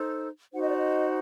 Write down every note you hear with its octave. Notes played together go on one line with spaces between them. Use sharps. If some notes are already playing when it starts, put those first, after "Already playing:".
Already playing: D#4 A4 C5
D#4 F#4 C5 F#5
D#5
D5
D#5